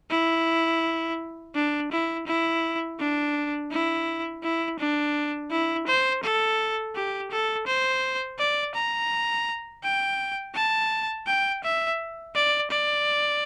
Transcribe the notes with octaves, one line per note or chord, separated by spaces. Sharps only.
E4
D4
E4
E4
D4
E4
E4
D4
E4
C5
A4
G4
A4
C5
D5
A#5
G5
A5
G5
E5
D5
D5